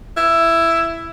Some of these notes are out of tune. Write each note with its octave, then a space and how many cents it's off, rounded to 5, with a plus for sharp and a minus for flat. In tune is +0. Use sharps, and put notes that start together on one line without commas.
E4 +10